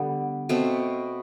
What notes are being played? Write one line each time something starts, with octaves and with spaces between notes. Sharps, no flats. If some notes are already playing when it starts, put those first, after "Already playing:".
Already playing: D3 G3 B3
B2 A3 C4